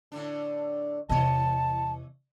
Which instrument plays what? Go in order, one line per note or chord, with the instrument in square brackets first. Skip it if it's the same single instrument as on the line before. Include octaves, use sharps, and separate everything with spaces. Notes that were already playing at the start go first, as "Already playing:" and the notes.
[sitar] A2 D3 D4
[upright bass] E2 C3 [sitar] E3 C#5 D#5 [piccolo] A5